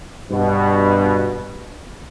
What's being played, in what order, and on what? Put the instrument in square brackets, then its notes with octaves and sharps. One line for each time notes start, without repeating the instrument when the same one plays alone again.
[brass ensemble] G2 B2